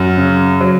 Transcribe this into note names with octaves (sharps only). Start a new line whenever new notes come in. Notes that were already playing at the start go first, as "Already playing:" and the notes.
Already playing: F#2 F#4
C#3
F#3